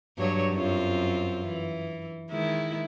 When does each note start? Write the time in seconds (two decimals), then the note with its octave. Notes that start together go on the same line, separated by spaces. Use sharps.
0.18 G2 F#3 C#5
0.54 F#2 C4 F4
1.45 E3
2.30 D#3 G#3 E4